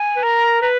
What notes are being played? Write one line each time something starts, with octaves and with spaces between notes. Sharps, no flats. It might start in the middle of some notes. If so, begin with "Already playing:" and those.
Already playing: G#5
B4
A#4 A#5
B4 A#5